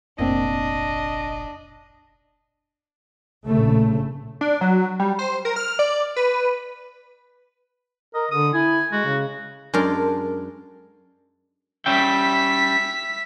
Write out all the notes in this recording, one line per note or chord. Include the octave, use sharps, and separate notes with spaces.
F1 A#1 A2 A#3 C4 D4 D#5
A#1 A2 C#3 A3
D4
F#3
G3
C5
A#4
F6
D5
B4
A#4 D#5
D3 D#6
E4 G#5
G#3 F#4
C#3
F#2 G#3 D4 A4 A#4 C6
G3 C#4 E5 G5 B6